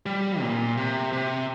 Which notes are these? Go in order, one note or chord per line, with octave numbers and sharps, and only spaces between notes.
G3
A#2
C3
C3